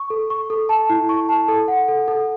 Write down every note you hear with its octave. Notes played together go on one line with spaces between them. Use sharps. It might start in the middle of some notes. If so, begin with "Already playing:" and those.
Already playing: C#6
A4
C#6
A4
A5
E4
C#6
A5
A4
F#5
A4
A4